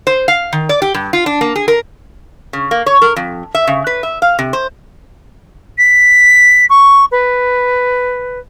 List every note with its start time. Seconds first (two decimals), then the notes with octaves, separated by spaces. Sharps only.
0.07 C5
0.28 F5
0.53 D#3
0.69 D5
0.82 G4
0.94 G2
1.13 F4
1.26 D4
1.41 A#3
1.56 G#4
1.68 A#4
2.53 C#3
2.71 A#3
2.86 C#5
3.02 A#4
3.16 F2
3.55 E5
3.67 C#3
3.87 B4
4.03 E5
4.22 F5
4.39 C3
4.53 C5
5.78 B6
6.70 C#6
7.12 B4